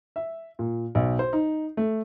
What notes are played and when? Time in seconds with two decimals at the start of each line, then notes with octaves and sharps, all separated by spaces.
0.16 E5
0.59 A#2
0.95 B1
1.19 C5
1.33 D#4
1.77 A3